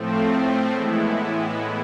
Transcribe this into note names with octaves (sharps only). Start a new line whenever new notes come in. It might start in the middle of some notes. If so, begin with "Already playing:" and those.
Already playing: A2 F3 A3 C4
A2 E3 G#3 B3 E4